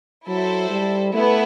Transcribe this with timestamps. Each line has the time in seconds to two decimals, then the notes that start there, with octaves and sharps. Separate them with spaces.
0.27 F#3 E4 A4 C5
0.70 G3
1.14 A3 B3 E4